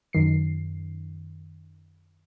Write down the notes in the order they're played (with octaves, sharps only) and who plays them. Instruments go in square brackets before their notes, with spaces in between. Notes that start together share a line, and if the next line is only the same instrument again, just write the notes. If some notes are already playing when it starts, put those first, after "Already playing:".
[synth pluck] F#2 D#3 C7